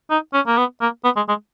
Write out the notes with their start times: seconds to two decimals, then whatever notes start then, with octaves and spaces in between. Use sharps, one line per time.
0.11 D#4
0.33 C#4
0.47 A#3
0.57 B3
0.81 A#3
1.05 B3
1.17 G#3
1.29 G#3